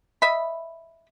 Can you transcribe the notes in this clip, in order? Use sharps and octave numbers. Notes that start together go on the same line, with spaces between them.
D#5 E5 B5